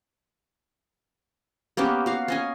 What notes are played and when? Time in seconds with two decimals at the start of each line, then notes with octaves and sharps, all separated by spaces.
1.77 A#3 B3 C#4 G4
2.06 F#4 F5
2.28 C#4 D#5 G#5